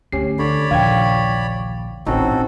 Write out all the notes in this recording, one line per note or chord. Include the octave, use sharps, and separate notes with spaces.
D2 C#4 G4 C7
D3 C#5 D5 B5
A#1 D#2 C#3 F5 G5 G#6
D#1 A1 C4 C#4 D#4 F#4 A4